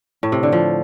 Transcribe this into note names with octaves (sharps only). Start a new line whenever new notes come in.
A2
C3
D3
F3